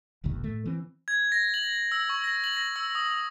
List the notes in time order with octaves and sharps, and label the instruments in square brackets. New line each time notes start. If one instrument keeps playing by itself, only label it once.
[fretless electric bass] E1 A#1 D#2 D#3
A2 A3
E3 C4
[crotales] G#6
A#6
F#7
E6
C#6
A#6
F#7
A#6
E6
D#6